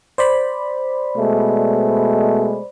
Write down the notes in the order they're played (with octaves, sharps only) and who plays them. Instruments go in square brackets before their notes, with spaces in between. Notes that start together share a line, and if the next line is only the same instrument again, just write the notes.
[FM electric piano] C5 D5 B5
[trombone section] B2 G#3 A3